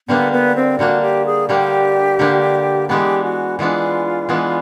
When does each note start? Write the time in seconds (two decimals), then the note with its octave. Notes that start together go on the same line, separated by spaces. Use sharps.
0.08 D3 G3 A#3 B3 D4
0.32 B3
0.56 C4
0.79 D3 G3 A#3 D4 F#4
1.02 G4
1.26 G#4
1.48 D3 G3 A#3 D4 G4
2.19 D3 G3 A#3 D4
2.89 E3 G#3 B3 D4 G4
3.24 F#4
3.59 E3 G#3 B3 D4 F4
4.29 E3 G#3 B3 D4